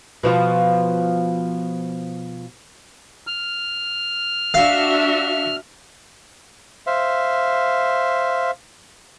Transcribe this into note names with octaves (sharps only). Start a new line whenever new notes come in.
B2 F3 F4
F6
D4 F#4 E5 F5
C5 E5 F5